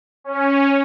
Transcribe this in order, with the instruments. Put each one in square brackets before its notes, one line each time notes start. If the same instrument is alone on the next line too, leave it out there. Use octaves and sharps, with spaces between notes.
[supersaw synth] C#4